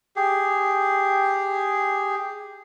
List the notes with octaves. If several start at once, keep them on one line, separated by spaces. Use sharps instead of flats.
G4 G#4